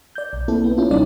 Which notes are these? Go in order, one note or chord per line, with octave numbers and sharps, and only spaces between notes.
D5 G6
B1
A#3 C4 E4 A4
B3
C#4 E4 F4
D2 C3 G3 C#4 D#4 D5